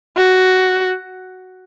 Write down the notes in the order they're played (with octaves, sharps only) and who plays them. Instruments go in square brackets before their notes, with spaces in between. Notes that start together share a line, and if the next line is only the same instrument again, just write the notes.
[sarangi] F#4